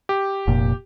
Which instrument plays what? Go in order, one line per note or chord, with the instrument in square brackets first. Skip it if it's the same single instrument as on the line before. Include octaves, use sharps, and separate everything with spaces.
[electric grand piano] G4
[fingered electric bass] F1 A#2